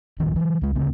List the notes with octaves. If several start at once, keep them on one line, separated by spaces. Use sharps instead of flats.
D#1 A1 D#3 F3
E3 F#3
C#2 G#3
D2 C#3 C4